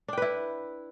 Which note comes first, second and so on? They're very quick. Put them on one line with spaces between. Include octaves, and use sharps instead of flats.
D4 G5 B4 E4